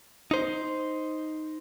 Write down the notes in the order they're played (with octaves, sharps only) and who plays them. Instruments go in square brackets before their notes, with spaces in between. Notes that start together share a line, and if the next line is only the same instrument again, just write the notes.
[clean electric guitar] D#4 C5